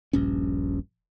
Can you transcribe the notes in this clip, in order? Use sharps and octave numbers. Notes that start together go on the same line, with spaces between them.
D#1 A#1 G2 C#4